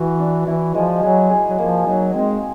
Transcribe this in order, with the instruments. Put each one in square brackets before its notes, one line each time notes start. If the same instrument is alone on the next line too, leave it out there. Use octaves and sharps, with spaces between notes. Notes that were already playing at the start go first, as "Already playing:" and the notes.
Already playing: [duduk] E3 [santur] F#4
[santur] D4
[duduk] E3 [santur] E4
[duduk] F3 [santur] G#3
[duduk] F#3 [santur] G#4
[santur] G#4
[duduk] F#3
[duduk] F3 [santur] A#3
[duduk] F#3 [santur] D#4
[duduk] G#3 [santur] C4